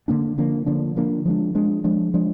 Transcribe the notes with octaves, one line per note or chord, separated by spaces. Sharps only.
D3 F3 A#3 D4
D3 F3 A#3 D4
D3 F3 A#3 D4
D3 F3 A#3 D4
F3 G#3 D4
F3 G#3 D4
F3 G#3 D4
F3 G#3 D4